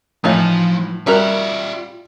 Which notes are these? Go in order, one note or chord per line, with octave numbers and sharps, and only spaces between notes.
A2 E3 F3 D#4 F4
G3 F4 F#4 A#4 E5